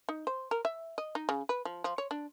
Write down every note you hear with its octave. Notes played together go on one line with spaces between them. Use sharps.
D#4
C5
A#4
E5
D#5
D#4
C#3
B4
F3
F3
C#5
D4